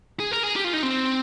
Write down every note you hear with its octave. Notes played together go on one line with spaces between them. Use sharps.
G#4
A#4
G#4
G4
F4
D#4
C4